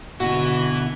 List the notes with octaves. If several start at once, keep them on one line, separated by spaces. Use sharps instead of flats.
B2 D3 E4 F#4 B4